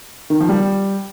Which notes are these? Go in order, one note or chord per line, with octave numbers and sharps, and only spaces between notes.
D#3
F3
G3